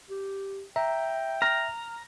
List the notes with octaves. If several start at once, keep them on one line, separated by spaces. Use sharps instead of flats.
G4
E5 G5 A#5
A#5 F6